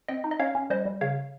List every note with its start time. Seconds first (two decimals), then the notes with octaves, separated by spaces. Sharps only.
0.08 C4 D#5 G5
0.24 D#4
0.31 D#5
0.40 C#4 C#5 F5
0.55 C#4
0.70 G3 C5 D#5
0.85 G3
1.01 C#3 C#5 F5